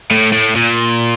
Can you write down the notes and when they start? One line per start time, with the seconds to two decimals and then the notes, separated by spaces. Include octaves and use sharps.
0.11 A2
0.33 A2
0.56 A#2